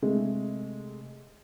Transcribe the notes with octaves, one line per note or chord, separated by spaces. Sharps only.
C3 G#3 A3